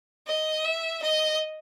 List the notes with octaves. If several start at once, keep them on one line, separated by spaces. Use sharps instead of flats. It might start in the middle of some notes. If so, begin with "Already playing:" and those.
D#5
E5
D#5